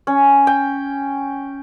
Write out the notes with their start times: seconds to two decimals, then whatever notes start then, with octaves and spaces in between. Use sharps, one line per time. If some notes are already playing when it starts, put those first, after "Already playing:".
0.07 C#4
0.47 G5